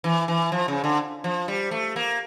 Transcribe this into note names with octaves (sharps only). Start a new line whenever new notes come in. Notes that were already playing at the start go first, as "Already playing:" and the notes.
E3
E3
F3
C#3
D3
F3
G3
A3
A#3